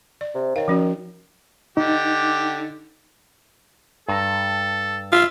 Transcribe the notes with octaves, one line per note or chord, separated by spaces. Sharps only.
D5
C3
D#3 C#5 F5
F3 C#4 F#4
D3 D#4 G4
G2 A4 A#5
F4 E5